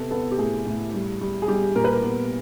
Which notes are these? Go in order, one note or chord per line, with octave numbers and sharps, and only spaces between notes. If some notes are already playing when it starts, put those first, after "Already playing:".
Already playing: C3 B3 A4
B3 A4
G4
A2 G#4
A2
G3
G3
G#4
G3 G4
A#2 A#4
B4
A#4
B3